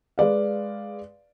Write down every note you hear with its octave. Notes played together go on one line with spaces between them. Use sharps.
G#3 B4 D5 F5